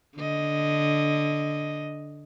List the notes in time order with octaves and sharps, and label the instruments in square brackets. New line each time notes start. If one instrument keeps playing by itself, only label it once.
[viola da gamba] D3 D#5